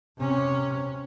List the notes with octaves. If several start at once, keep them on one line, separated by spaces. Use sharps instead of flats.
C3 C#4